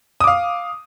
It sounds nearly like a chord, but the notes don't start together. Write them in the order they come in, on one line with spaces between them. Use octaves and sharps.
D#6 D6 F5